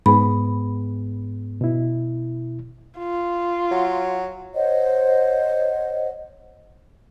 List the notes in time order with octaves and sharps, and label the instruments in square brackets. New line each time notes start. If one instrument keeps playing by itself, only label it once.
[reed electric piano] G#2 B3 G#4 [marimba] B5
[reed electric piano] B2 E4
[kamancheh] F4
[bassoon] F#3
[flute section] C5 C#5 D#5 F#5